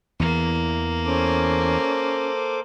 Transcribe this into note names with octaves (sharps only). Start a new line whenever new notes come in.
E2 E3 A#3
C#4 A4 C5 D6